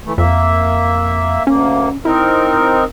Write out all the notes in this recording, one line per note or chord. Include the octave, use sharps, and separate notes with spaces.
E3 A3
F2 A#3 E5
D2 A#3 C#4
C4 D#4 E4 A#4